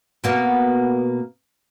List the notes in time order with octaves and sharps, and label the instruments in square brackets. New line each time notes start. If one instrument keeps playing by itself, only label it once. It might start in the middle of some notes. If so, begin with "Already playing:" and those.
[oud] B2 A#3 B3